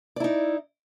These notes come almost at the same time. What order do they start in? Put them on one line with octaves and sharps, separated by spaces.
D5 E4 D#4